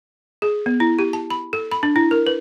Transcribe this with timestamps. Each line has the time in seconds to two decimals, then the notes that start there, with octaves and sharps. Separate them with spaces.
0.42 G#4
0.66 B3
0.80 E4
0.99 G4
1.13 A5
1.30 B5
1.53 A4
1.72 B5
1.83 D4
1.96 E4
2.11 A#4
2.27 B4